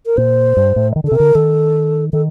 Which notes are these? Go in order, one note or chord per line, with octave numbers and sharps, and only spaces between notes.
A#4
A#2 C5
G2
A2
D#3
D3
A4
C3
D3 A#4
D#3 A4
D#3 A4